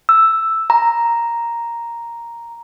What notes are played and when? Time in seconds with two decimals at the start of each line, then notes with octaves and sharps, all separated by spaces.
0.09 E6
0.70 A#5